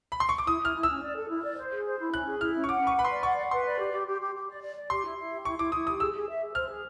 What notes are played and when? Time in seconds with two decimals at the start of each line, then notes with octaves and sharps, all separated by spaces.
0.12 B5
0.20 C6
0.29 C#6
0.38 D6
0.47 E4 D#6
0.61 E4 F6
0.75 E4
0.83 E6
0.89 C#4
1.02 D5
1.16 A4
1.29 E4
1.44 D5
1.58 C5
1.72 G#4
1.86 C5
1.99 E4
2.13 C#4 F#6
2.27 G#4
2.40 E4 F6
2.54 C#4
2.64 C#6
2.68 F#5 D6
2.83 B4 C#6
2.97 B4 B5
3.05 C6
3.10 D5
3.23 F#5 C#6
3.37 F#5
3.51 B4 C6
3.65 D5
3.79 G4
3.93 G4
4.06 G4
4.20 G4
4.35 G4
4.48 D5
4.61 D5
4.76 D5
4.89 G4 C6
5.04 E4
5.18 E4
5.32 G4
5.45 E4 C#6
5.58 E4 D6
5.72 E4 D#6
5.87 G4 D#6
6.00 G#4 E6
6.14 G#4
6.29 E5
6.42 G#4
6.55 C5 F6
6.69 G#4